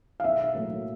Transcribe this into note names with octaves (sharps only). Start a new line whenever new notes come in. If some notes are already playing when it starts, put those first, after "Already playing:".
F5
B1 E5
A2 F#3 A#3